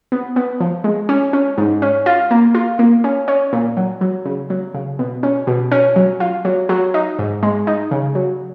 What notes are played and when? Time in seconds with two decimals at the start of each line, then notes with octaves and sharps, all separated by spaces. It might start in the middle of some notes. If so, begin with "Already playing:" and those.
0.12 B3
0.36 B3
0.60 F3
0.84 G#3
1.09 C#4
1.33 C#4
1.58 G#2
1.82 C#4
2.06 F4
2.31 A#3
2.55 F4
2.79 A#3
3.04 C#4
3.28 C#4
3.53 A#2
3.77 F#3
4.01 F#3
4.25 C#3
4.50 F#3
4.74 C#3
4.99 B2
5.23 C#4
5.47 B2
5.71 C#4
5.96 F#3
6.20 F4
6.45 F#3
6.69 F#3
6.94 D#4
7.19 G#2
7.43 G#3
7.67 D#4
7.91 C#3
8.15 F#3